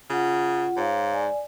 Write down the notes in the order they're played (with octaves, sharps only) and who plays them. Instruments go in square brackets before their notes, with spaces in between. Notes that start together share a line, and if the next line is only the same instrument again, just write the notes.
[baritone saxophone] C#3 [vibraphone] F4 F#5
[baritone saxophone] G#2 [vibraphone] C#5 F5
[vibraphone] D5 G#5